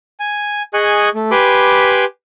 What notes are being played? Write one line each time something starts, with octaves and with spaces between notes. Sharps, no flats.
G#5
G#4 D#5 G#5 C#6 F#6
A3
G4 B4 G#5 B5 C6 D6